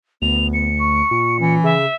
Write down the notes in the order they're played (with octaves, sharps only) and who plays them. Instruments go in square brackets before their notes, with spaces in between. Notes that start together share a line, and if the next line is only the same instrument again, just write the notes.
[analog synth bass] D2 [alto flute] B3 [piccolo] F7
[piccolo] C#7
[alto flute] C#6
[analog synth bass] A#2
[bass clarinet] E3 [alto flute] C#4
[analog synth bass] C#3 [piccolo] E5